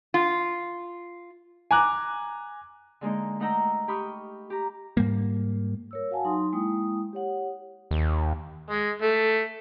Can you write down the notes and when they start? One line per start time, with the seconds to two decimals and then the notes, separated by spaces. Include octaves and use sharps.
0.14 F4
1.71 G#5 A#5 D6 F#6
3.01 D3 G#3 A#3 D#4
3.40 A3 D#4 F#5 G5 A#5 E6
3.88 G4 G5 B5 C#6 D#6 F6
4.50 G4 A#5
4.97 G#2 G3 A#3
5.91 A#4 C#5 E6
6.11 F#4 F5 F#5 G#5 A5
6.25 F#3 D#4 C6 D#6
6.53 G#3 A#3 E4 G5 D#6
7.13 G4 C#5 F#5
7.91 D#2
8.70 G#3
9.02 A3